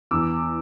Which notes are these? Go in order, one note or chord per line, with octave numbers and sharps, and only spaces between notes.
E2 D6 E6